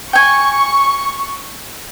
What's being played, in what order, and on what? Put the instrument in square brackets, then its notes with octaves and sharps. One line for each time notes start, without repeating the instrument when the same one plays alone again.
[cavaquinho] G5 G#5 [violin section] C#6